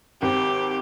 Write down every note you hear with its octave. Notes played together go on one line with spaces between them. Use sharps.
G#1 G4